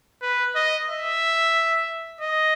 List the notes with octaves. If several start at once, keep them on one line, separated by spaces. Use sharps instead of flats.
B4
D#5
E5
D#5